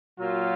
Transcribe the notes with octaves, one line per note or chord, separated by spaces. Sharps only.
A#2 F#3 F4